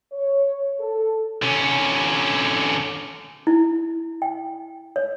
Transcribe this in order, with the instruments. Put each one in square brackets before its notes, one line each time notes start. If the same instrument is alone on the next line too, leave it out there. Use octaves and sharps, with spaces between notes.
[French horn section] C#5
A4
[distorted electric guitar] D3 C#4
[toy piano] E4
G5
C#5